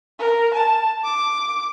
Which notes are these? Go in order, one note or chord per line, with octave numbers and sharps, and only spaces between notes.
A#4
A5
D6